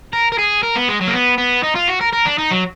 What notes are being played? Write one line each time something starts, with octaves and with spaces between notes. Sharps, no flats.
A#4
A#4
G#4
A#4
B3
G#3
F#3
A#3
B3
B3
D#4
F4
F#4
A#4
A#4
D4
D#4
F#3